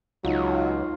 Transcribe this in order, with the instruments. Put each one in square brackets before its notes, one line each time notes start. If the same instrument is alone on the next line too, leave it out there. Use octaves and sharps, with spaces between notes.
[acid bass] C#2 [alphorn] F#3 [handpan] D#4 F4